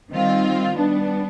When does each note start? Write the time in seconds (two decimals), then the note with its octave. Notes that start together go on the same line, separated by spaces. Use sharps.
0.11 D#3 G3 C4 F4
0.75 G3 B3 D4